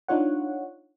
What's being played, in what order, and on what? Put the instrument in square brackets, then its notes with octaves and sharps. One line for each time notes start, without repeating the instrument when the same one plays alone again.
[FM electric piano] D4 D#4 F4 C#5 F#5